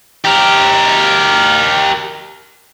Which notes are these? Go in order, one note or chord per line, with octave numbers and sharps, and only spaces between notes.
G4 A#4